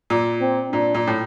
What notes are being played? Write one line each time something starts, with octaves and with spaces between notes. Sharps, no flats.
A#2
C4
A#2 D4
A#2
A2